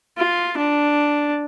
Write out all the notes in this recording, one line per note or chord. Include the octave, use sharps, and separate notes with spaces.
F4
D4